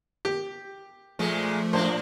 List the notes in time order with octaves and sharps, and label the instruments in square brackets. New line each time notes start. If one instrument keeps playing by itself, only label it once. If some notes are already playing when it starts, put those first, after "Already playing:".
[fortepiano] G4
[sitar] A#2 G#3 [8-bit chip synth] F3 A3
[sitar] A2 D4 [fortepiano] C5